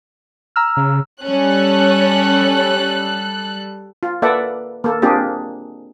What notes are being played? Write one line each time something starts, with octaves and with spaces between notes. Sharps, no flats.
A#5 E6 F6
C#3
G3 C#4 A4 F#6
F4
A#3 A4 B4 D5 E5 F#5
A#3 A4
A#3 C4 D4 F4 G4 G#4